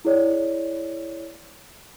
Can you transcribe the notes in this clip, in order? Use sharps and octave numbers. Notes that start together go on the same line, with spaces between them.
E4 G#4 C#5 D5